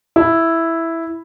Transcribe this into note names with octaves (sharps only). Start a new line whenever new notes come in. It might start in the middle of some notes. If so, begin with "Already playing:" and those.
E4